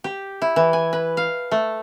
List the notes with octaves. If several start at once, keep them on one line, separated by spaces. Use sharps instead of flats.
G4
E4
E3
G#5
B4
F5
A3